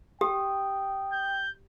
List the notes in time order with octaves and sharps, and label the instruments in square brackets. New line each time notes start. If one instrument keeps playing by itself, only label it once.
[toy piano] G4 [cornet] G5 [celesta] D#6
[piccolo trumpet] G6